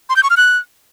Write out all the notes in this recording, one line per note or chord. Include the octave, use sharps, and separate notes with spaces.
C6
G6
C#6
F6
F#6